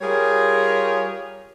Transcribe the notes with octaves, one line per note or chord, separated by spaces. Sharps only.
G3 F4 G#4 A#4 C#5